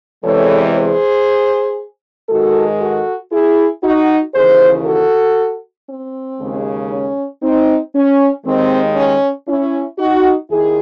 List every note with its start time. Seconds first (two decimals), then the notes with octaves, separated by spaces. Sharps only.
0.24 E2 C3 E3 G#3 A4 C#5
0.75 G#4 C5
2.29 G#2 D#3 G#3 F#4 A4
2.80 F#4 A4
3.32 E4 G#4
3.83 D#4 F#4
4.34 D#2 C#3 E3 G#4 C5
4.85 F#4 A4
5.89 C4
6.39 D#2 C#3 G#3
6.90 C#4
7.42 C4 D#4
7.94 C#4
8.45 D#2 D#3 G#3 C4
8.96 C#4
9.48 C#4 E4
9.98 D#4 F#4
10.50 D#2 D#3 E4 G#4